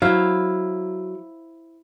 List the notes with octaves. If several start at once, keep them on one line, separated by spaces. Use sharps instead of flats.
F#3 E4 C5 F5